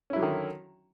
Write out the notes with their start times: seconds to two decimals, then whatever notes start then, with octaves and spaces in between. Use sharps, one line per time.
0.10 C#4
0.13 E4
0.16 F#3
0.20 D3
0.23 D#3